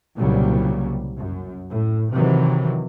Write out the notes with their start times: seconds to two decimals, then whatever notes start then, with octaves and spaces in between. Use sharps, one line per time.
0.17 C2 A#2 C#3 F#3 G3
1.17 F#2
1.69 A2
2.12 C3 D#3 E3 F#3